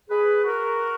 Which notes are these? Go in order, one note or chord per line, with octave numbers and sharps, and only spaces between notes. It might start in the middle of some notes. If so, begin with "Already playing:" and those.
G#4 B4
F#4 A#4